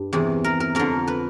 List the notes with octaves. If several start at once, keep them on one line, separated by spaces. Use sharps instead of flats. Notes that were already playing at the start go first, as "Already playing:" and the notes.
Already playing: G2
E2 C3 E3
A#4
A#4
F2 D3 A#4
B4